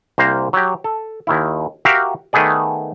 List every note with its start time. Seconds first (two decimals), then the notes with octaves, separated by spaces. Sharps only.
0.18 C2 A#3 C5 A#5
0.53 F#3 G4
0.84 A4
1.27 D#2 D#3 E4
1.85 F#4 G4 A#4 E5 F5
2.33 D#3 A3 B3 G#4 D5